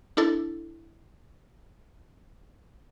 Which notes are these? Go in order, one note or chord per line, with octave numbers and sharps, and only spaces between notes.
D4 E4 A4